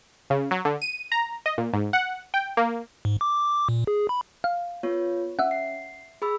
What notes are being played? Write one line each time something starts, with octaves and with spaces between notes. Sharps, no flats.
C#3
F#3
D3
D#7
A#5
D#5
A#2
G#2
F#5
G5
A#3
G#2
D6
A#2
G#4
B5
F5
B3 F4 C#5
C#4 E5 F#5
C7
G#4 B5 E6